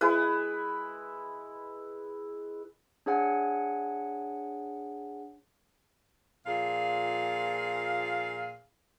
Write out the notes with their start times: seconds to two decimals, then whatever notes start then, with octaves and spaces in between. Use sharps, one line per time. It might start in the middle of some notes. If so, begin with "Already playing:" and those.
0.01 G#3 E4 B4
3.06 D4 G#4 C#5 F#5 G#5
6.46 A#2 F3 G#4 F5